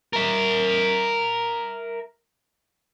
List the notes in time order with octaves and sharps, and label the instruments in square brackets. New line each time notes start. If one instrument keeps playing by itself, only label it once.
[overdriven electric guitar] A#4 E5